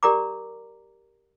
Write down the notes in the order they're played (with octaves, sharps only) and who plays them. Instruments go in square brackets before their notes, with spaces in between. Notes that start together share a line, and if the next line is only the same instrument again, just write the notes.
[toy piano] G4 A#4 D5 A#5 D6